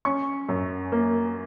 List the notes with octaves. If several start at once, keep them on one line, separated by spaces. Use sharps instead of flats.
C#4 C#6
F#2
A#3